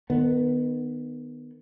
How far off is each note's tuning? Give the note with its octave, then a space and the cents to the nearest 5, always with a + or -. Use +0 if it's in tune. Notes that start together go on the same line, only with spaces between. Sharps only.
D#3 -30 B3 +0